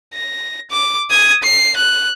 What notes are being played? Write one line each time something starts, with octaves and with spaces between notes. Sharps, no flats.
A#6
D6
D#6 G#6
C7
F#6